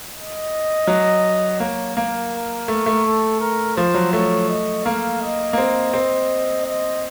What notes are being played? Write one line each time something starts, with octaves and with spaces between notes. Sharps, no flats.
D#5
F#3
A#3 C#5
A#3 A#4
A3
A3
A4
A#4
F3 C5
F#3
A3 C#5
D#5
A#3 F5
D#5
A#3
C4
C4
D#5